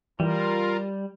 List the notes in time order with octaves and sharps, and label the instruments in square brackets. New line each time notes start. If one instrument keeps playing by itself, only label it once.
[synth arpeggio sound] E3 [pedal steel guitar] G3 [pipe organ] F4 A#4